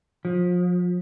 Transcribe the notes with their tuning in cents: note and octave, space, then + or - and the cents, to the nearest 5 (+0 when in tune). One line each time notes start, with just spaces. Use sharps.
F3 +30